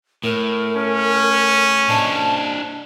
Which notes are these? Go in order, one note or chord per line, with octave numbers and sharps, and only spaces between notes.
A2 A#4
C#4
D4 C5 D#5 A5